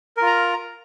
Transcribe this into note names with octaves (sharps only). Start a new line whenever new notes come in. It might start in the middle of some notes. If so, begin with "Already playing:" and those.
F4 A#4 A#5